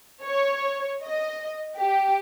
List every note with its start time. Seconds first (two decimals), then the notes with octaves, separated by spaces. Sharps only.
0.23 C#5
1.02 D#5
1.78 G4